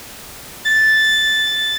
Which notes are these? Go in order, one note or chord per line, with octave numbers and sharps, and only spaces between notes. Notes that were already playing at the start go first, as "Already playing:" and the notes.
A6